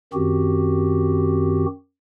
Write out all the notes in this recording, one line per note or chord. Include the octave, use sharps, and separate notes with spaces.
F#2 D#3 C4 F#4 G4